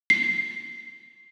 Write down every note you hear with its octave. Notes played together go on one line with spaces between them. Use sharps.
C7